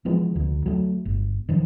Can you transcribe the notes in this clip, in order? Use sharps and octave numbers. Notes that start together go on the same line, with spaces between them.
E3 F3 G#3 B3
D2
F#3 A3
G1
D#3 F3 F#3